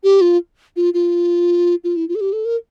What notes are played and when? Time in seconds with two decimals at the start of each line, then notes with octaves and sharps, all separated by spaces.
0.04 G4
0.21 F4
0.76 F4
0.94 F4
1.84 F4
1.96 E4
2.09 F4
2.15 A4
2.21 G4
2.33 A4
2.45 A#4